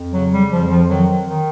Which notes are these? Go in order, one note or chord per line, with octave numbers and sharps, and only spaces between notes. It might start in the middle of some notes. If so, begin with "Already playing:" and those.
Already playing: F2
C#3 F#3
G3
F2 F3
F3
D#3 F#3
D#3